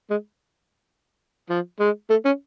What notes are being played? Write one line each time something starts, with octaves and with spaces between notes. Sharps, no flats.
G#3
F3
G#3
A3
C#4